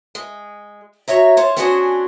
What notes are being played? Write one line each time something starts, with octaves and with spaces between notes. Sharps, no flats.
G#3
F#4 C#5 E5 A#5
F4 C5 C#5
B3 C#4 D4 F#4 G#4 C5